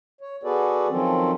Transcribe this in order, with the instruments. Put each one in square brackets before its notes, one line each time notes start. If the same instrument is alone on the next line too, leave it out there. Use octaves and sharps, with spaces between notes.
[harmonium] C#5
B3 F#4 G#4 A4 B4 D5
D#3 F3 F#3 C4 C#4 A4